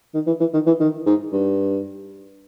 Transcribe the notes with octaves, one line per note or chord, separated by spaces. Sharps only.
D#3
E3
E3
D#3
E3
D#3
G#2
G2